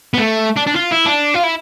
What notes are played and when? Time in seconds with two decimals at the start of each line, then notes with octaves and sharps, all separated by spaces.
0.14 B3
0.18 A3
0.57 D4
0.67 D4
0.76 F4
0.92 E4
1.06 D4
1.35 F4
1.44 E4